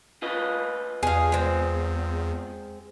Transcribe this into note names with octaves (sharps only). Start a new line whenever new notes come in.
F4 B4 D#5
E2 G#4 F5
G#3 C4